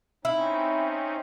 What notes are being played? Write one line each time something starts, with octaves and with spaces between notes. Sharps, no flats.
C4 C#4 D#4 E4